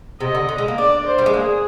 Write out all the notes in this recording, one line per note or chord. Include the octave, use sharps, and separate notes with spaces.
C3 D#5
D3
D3
G#3
A#3
D4 D5
C5
G3
G#3
A#3 G#4